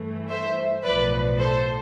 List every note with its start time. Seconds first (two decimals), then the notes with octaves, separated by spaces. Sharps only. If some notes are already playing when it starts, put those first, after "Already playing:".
Already playing: G2 E3 A3
0.29 C5 E5
0.84 B1 A2 F3 B4 D5
1.39 A4 C5